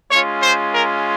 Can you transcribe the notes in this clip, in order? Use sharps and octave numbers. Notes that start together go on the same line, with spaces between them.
G#3 C#4 F4 C#5
C5
A#4